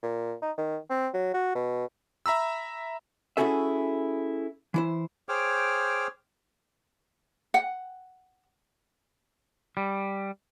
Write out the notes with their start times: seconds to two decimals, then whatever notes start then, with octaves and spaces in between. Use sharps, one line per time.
0.03 A#2
0.42 D#4
0.58 D#3
0.90 C4
1.14 F#3
1.34 F#4
1.55 B2
2.26 E5 A#5 B5 E6
3.37 C#4 E4 F#4 G#4 A4 E5
4.74 E3 E4 C5
5.29 G#4 C5 C#5 G5 D6 F6
7.54 F#5
9.77 G3